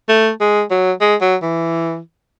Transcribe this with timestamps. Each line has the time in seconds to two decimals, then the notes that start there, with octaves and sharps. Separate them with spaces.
0.09 A3
0.40 G#3
0.71 F#3
1.01 G#3
1.22 F#3
1.42 E3